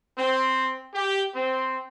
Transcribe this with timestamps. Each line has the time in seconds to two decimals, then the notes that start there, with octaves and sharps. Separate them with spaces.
0.18 C4
0.94 G4
1.34 C4